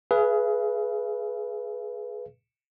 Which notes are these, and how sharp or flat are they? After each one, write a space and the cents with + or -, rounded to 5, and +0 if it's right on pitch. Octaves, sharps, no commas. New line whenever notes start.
G#4 +20 B4 -10 F5 -45